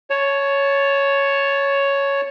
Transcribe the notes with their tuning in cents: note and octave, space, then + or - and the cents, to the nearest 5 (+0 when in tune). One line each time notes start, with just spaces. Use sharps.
C#5 +5 A5 -15